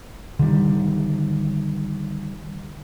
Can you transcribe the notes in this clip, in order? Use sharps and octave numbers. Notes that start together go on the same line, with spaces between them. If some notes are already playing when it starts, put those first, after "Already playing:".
D3 D#3 G3